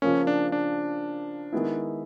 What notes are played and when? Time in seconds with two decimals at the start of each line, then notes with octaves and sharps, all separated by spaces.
0.02 C#3 F3 A#3 C#4
0.27 D4
0.52 D4
1.53 D#3 G#3 B3 E4